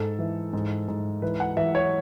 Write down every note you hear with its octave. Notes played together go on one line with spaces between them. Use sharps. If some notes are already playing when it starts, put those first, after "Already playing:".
Already playing: G#2 A4
E3
G#2
G#2
E3 B4
F#5
E3 E5
C#5